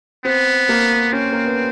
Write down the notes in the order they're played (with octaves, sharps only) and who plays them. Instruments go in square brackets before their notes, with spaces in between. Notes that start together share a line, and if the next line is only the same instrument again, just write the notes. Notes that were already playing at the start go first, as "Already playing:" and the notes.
[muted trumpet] B3 [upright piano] C4
[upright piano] A#3
[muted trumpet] C4 [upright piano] C#4
[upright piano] A#3
B3